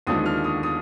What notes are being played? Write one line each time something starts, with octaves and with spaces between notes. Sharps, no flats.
D#2 D3 F3 G#3 D#6
F6
D#6
D#6